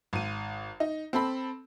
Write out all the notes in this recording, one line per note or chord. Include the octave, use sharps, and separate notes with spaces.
G#1 D#7
D#4
C4 A4 B5